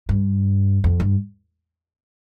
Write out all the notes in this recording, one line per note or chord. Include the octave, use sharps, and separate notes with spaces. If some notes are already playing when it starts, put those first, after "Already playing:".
G2
F2
G2